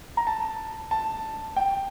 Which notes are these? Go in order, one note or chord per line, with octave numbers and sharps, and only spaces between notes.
A#5
A5
A5
G5